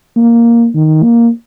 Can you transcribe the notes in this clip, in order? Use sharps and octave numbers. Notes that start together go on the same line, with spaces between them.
A#3
D#3
A#3